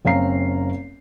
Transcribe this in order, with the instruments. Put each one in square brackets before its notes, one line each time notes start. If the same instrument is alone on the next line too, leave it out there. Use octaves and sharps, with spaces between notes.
[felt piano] F#1 C4 C#4 F5 A#5 C7